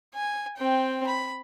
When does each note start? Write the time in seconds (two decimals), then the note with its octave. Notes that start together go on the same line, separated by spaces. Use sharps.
0.15 G#5
0.57 C4 G5
1.07 B5